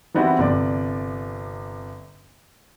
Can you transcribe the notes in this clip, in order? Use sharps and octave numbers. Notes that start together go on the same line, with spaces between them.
E3 G3 B3 C4 E4 F#4
G1 C3 D5